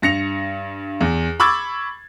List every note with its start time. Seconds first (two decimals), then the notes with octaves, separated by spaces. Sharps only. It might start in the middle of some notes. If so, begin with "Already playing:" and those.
0.02 G2 A#6 C#7 F7
1.01 E2
1.40 B5 C#6 D6 E6 G#6 A6